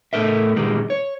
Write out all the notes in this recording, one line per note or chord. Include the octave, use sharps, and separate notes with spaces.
A2 A4 A#4 E5
A#2 D#3 G3 G#3
C#5